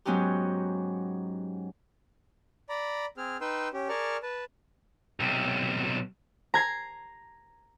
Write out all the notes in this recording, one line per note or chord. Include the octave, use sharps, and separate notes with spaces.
G#2 F#3 B3 C#4 D#4 G4
D5 A#5 B5
C4 G#4 F6
D#4 B4 G5 C6 E6
C#4 G4
G#4 A#4 D5 A5 C#6 F6
B4 A5
B1 C3
A#5 G#6 C7